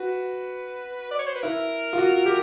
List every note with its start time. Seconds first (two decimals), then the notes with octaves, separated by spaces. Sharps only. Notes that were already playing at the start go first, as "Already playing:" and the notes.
Already playing: F#4 B4
1.11 D5
1.19 C#5
1.27 C5
1.35 B4
1.43 E4 A#4
1.93 F4
1.98 F#4
2.26 G4